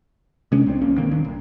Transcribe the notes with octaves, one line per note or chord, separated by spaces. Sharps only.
C3 G#3 C#4 D4
C#2 C4 D4
D1 B1 A#3 C#4
D3 D#3 A#3 C4
D#1 G2 D#3 D4
A#1